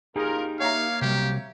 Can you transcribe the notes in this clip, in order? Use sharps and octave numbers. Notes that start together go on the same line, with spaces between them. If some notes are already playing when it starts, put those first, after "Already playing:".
A1 D#4 F4 G4 G#4 A#4
A#3 C#5 E5 F5 A#5
C3 F#3 G3 G4